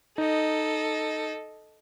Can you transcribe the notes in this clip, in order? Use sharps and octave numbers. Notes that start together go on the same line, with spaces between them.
D#4 A4 D#5